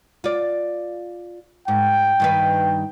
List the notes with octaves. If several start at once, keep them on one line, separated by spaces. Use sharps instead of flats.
F4 D5
G#2 G5
G2 D#3 B4